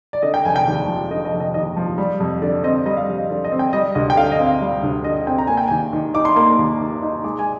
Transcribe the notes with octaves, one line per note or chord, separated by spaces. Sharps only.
D5
D3 D#5
G5
F1 G#5
G5
D#2
F3
D3 D#5
D#5
F1
D#5
D#2 D#5
F3
G3
F2
D3 D5
C4 D#5
G3 D#5
F5
F2
D#5
D3 D5
D#5
C4
G5
G3 D#5
D2 D#5
G5
D3 F5
D#5
C4
F5
G3
D2
D3 D#5
D#5
C4 G5
A#5
A#3 G#5
G5
D#2 G#5
D#3
D#4 D6
C6
A#3 C6
D#2
D#3
D#4
G#3 D6
G#5